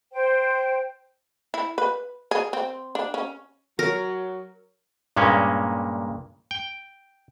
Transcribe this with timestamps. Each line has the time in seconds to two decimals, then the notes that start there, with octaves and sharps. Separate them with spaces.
0.12 C5 G5
1.54 E4
1.78 B4
2.31 G#4
2.53 C4
2.95 D4
3.14 C#4
3.79 F#3 A#4
5.17 G2 A#2 G#3 A#3 C#4
6.51 G5